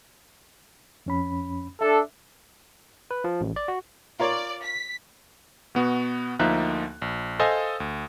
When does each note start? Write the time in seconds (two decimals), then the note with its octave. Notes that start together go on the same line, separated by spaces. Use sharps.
1.06 F2 C#4 B5
1.81 D4 A4 E5
3.11 B4
3.24 F3
3.41 A1
3.56 D5
3.68 F#4
4.20 F4 A#4 C#5 D5
4.63 B6
5.75 B2 B3 F#4
6.39 D2 F3 A#3 D#4 E5 F#6
7.02 A#1
7.39 A4 C5 D#5 F5 G#5 D#6
7.80 D2